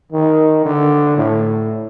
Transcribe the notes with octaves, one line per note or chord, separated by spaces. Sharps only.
D#3
D3
A2